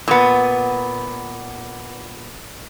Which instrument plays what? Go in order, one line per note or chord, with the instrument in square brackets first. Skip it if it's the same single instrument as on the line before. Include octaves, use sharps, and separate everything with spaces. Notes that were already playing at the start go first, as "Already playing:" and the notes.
[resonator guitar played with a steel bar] A#2 B3